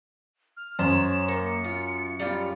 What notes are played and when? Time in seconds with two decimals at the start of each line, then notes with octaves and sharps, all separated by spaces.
0.57 F6
0.79 F#2 C5 C#5 E7
1.28 A#3 C#7
1.65 F4
2.20 G3 F4